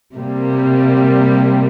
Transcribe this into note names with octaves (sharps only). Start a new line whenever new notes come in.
C3 G3 A#3